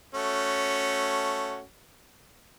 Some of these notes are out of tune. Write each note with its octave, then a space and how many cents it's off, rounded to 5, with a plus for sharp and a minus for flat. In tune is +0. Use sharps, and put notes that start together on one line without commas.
A3 +0 C#4 +0 F#4 +0